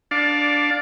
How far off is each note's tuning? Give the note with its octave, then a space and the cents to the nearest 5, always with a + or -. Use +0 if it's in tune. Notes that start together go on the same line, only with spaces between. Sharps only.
D4 -10 D5 +0 F5 +20